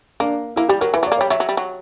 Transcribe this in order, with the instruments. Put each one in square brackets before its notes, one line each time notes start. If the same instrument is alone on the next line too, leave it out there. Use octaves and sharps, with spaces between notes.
[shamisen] A#3 [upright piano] D4
[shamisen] A#3 [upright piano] E4
[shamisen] G3 [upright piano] G4
[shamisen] F#3 [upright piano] A#4
[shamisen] E3 [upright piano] B4
[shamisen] F#3
[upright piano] D5
[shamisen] A#3
[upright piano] C#5
[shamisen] G3
[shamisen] F#3 [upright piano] E5
[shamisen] F#3
G3
F#3